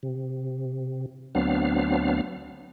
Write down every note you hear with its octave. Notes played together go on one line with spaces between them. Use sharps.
C3
D2 F#3 B3 C4 D4 F5